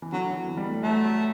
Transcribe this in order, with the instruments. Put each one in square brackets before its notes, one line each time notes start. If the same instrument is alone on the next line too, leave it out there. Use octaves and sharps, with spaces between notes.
[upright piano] E3
[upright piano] D3 [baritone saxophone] F#3
[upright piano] E3
D3
E3
G3
A3
[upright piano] F#3 [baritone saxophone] A3